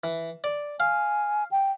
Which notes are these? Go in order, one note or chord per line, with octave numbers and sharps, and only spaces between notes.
E3
D5
F5 G#5
G5